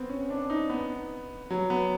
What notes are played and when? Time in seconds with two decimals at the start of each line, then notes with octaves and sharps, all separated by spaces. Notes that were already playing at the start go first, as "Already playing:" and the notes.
Already playing: B3 C4
0.09 C#4
0.30 D4
0.50 D#4
0.70 B3
1.50 F#3
1.70 B3